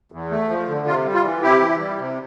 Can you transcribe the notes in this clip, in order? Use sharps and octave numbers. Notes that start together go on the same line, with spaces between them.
E2
A3
F3
D3
C3 F4
G3
F4
E3
C3 E4 G4
E3
G3
C3